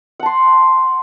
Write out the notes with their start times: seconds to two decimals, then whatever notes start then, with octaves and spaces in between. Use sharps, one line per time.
0.20 F#5
0.23 A5
0.26 C6